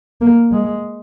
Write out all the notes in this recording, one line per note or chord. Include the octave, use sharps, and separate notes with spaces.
A#3
G#3